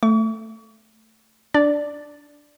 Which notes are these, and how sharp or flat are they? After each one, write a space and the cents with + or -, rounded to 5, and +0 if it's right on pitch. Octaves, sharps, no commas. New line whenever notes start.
A3 +10 C#6 +45
D4 +0 D5 +0